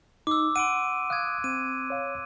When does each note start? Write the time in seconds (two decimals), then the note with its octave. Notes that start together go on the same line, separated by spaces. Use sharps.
0.27 D#4 D6 E6
0.56 F#5 C6 D7 D#7
1.10 F5 D#6 F#6 G#6
1.44 C4 D#7
1.90 C#5 F5